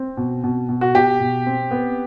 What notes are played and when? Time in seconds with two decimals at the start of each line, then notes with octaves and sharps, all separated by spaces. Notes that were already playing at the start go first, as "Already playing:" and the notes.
Already playing: C4
0.17 B2
0.44 B2
0.69 B2
0.81 F#4
0.94 B2 G4
1.20 B2
1.46 C4
1.71 B3